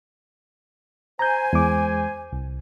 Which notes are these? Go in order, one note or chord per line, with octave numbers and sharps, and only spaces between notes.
C5 G#5 A#5 G6
E2 G#3 D6
C2